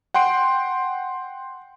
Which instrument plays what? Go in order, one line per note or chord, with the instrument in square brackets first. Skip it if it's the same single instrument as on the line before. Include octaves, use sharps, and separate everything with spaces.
[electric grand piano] F#5 G5 C6 D7